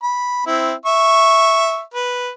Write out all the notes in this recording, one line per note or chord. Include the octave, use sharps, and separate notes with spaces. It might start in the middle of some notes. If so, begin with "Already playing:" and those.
B5
C4 E4
E5 C#6
B4